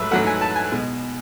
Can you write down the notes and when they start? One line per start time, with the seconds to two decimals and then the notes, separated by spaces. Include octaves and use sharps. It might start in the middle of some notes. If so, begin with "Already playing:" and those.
Already playing: G#2 F#3 A3 B4 E5
0.11 G#2 F#3 A3 F#5
0.27 G#5
0.41 A5
0.56 G#5
0.71 B2 G#3